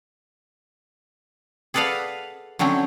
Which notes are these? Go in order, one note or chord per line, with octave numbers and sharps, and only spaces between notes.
G#4 A4 B4 D5 F5 F#5
D3 F#3 C4 C#4 E4